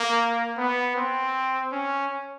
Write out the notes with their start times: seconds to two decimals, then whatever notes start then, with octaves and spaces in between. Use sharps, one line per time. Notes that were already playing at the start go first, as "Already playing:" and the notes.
Already playing: A#3
0.57 B3
0.96 C4
1.72 C#4